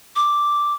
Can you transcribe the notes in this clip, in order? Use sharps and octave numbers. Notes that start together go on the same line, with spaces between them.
D6